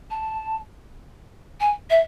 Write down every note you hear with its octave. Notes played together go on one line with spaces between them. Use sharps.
A5
G#5
E5